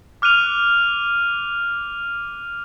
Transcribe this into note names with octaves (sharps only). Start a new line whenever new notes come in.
D6 F6 F#6 D#7 F7